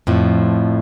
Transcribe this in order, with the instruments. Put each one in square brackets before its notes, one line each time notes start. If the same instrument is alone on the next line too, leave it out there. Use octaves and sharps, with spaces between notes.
[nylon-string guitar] F2 A2 F3